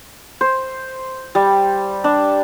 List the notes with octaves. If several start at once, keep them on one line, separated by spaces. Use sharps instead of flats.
C5
G3
D4